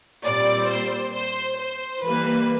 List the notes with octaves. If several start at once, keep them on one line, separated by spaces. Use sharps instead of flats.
A#2 G3 C4 D5
C5
C5
C5
E3 G3 A#3 B4